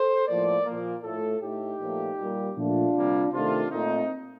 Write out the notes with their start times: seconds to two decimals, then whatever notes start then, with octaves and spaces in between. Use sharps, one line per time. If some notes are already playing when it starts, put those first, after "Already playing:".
Already playing: A4 C5
0.28 A2 F3 A#3 A#4 D5
0.66 A#2 F3 A#3
1.04 A2 A3 F4 A4
1.42 A2 A3 D#4 G4
1.80 A#2 F3 A3
2.18 A#2 G3 A#3
2.57 A#2 F3 A3 D4 F4
2.94 C3 G3 A#3
3.33 C3 D#3 A3 D4 F4
3.71 A#2 A3 C4 D#4